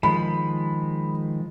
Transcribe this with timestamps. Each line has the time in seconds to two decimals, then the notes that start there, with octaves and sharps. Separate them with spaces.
0.03 D#3 F3 G#3 B5